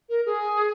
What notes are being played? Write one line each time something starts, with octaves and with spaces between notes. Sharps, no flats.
A#4
G#4